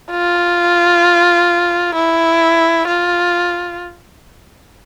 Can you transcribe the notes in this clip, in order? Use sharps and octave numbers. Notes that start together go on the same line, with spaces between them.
F4
E4
F4